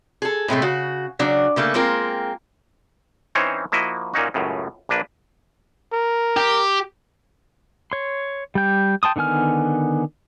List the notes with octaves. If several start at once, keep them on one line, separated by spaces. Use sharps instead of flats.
G#4 A4
A2 C3 G#3 A3
C#3 F#4
C#3 F#3 D4
C#3 A3 A#3
G#3 A#3 C4 F4 A#4
E3 C4 C#4 D#4 C5 C#5
F3 A#3 E4 F#4 D#5 E5
A#2 A#3 C#4 D#4 F#4
C#2 F#2 A2 C#3
A#1 A#3 D4 B4
A#4
G4
C#5 C6
G3 G5
G5 A5 C6 D#6
D3 D#3 B3 G#5 F6